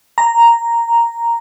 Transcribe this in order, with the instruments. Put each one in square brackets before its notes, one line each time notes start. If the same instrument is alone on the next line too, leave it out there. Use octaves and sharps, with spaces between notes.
[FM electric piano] A#5